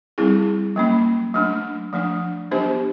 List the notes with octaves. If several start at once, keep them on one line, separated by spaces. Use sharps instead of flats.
G3 C4 E4 G#4
F#3 A#3 C#4
F#3 A3 D4
F3 A3 D4
F#3 B3 D4 G4 C5